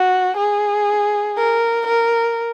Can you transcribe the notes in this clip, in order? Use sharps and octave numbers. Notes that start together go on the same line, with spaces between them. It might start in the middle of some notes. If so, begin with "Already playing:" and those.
Already playing: F#4
G#4
A#4
A#4